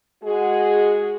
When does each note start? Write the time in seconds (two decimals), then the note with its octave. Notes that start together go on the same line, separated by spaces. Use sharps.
0.24 G#3 F#4 G#4